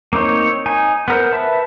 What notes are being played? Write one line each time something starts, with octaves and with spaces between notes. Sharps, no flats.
A#3 C4 D#4 C#5
D#4 G#5
B3 A#4 C5
B4 E5 A5